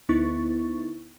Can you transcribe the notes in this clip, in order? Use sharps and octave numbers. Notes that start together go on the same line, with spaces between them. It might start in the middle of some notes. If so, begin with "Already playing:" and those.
D2 B3 D#4 E4 C#6 A6